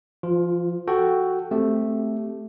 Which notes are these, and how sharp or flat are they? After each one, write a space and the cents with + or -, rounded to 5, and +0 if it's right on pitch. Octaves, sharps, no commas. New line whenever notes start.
F3 -30 F4 +10
F#4 +5 A4 +0 G5 +0
A3 +0 C4 +0 G4 +10